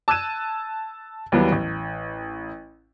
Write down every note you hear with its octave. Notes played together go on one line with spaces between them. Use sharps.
A5 E6 F#6 G#6 D#7 E7
D#2 E3 F#3 G3 B3
A1